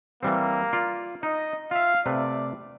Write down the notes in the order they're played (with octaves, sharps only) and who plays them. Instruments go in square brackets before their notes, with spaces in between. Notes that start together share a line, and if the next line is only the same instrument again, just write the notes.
[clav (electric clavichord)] E3 G3 C4 [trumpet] A#3
[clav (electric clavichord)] F4 D5
[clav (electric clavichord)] D#4 [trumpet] D#5
[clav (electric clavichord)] F4 E5 [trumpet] F5
[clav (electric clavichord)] C3 A3 B4 [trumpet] D5